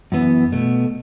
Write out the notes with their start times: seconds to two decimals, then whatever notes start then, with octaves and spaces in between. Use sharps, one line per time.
0.12 F#2 E3 B3
0.52 B2 A3